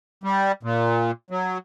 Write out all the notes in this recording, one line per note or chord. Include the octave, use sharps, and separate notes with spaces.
G3
A#2
F#3